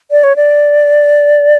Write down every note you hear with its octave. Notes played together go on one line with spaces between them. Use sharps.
D5
C#5
D5